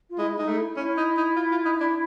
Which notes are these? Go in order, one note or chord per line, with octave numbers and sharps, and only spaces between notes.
F4
G#3 E4
E4
G#3 D#4
A3
E4
C#4 E4
D#4
D#4
F4
F4
D#4
D4